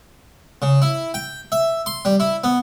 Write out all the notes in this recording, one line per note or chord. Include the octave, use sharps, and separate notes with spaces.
C#3
E4
G5
E5
C6
G3
E4
B3